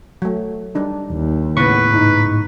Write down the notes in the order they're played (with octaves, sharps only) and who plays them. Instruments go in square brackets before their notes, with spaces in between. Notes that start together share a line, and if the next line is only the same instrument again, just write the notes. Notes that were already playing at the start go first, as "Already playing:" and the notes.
[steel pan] F#3 A3
G3 D4 D#4
[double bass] D#2
[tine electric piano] A2 C#6 [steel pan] C#3 B3 [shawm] B4
[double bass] G#2 D#4